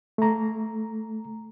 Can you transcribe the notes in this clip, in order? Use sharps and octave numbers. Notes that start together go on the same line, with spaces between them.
A3 A#5